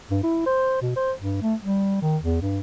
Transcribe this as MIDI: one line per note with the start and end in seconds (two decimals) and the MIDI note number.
0.11 0.19 43
0.23 0.46 64
0.46 0.81 72
0.81 0.91 47
0.96 1.13 72
1.21 1.40 43
1.42 1.55 57
1.62 2.01 55
2.02 2.17 51
2.22 2.41 40
2.42 2.60 43